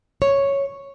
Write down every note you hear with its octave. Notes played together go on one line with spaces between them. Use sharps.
C#5